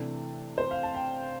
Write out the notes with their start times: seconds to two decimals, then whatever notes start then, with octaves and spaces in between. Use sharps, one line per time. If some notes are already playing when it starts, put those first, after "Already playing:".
Already playing: C3 E3 A3 D4
0.58 C5
0.71 F5
0.83 A5
0.95 G5